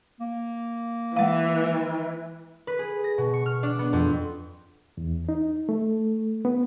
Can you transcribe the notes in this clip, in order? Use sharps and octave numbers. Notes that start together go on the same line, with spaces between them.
A#3
E3 G#3 F5
B4
G#4
A#6
B2
C#6
F6
D4
B3
F2
E2
D#4
A3
B3